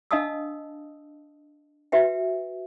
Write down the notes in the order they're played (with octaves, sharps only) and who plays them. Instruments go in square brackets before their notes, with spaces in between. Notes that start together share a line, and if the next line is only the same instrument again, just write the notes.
[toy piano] D4 D#5 F5 A5 D#6 E6
F#4 B4 E5 G5